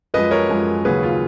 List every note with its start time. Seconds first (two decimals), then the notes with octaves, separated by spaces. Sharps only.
0.14 F#2 F3 G#3 B4 D#5
0.31 A#4 C#5
0.49 F#2 F3 G#3
0.85 D#2 C#3 F#3 C#4 G#4 B4
1.03 F4